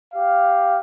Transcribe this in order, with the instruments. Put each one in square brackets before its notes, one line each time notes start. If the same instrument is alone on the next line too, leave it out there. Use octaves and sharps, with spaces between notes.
[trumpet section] G4 F5